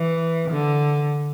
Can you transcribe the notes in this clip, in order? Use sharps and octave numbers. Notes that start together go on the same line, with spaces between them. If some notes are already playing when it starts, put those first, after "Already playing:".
Already playing: E3
D3